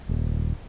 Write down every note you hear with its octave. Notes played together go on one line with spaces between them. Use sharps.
D#1